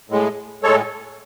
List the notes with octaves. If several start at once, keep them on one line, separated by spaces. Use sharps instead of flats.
A2 G#3
A2 G#3 A4 C#5